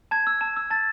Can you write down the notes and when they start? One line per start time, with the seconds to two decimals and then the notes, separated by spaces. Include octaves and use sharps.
0.11 A5 G#6
0.27 E6
0.41 A5
0.56 E6
0.70 A5 A6